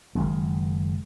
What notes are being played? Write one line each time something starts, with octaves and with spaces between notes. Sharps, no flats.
F#1 D#3 G#3